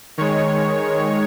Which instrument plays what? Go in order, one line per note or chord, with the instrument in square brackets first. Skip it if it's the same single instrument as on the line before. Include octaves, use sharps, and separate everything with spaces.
[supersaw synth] D#3 G#3 C#5